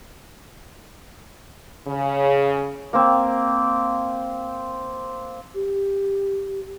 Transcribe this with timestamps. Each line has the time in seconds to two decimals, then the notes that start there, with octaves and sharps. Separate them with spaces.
1.88 C#3
2.93 A#3 C4
5.55 G4